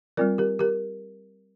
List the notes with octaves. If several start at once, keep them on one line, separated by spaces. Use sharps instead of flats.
G3 C4 F4 A#4 D5
G4 A#4
G4 A#4